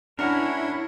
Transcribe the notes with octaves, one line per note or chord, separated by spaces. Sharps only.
C#4 D4 E4 F#4 A#4